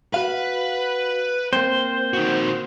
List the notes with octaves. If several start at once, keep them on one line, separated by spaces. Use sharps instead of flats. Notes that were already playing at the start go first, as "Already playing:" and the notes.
F#4 B4 F5
A#3 C4 C5
D#3 F#4